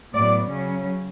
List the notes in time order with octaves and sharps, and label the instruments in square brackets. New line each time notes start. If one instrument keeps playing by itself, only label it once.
[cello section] A2 F#3 B3 D5
C#3 F#3 C#4